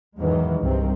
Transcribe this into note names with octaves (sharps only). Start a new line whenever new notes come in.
E2 G#2 D#3 E3 F#3 G#3
C2 G2 D#3 C4